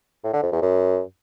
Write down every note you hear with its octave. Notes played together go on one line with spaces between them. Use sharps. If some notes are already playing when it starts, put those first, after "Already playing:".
A2
D3
F2
E2
F#2